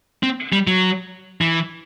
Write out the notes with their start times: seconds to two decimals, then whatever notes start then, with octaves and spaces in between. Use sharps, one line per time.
0.23 C4
0.53 G3
0.67 F#3
1.41 E3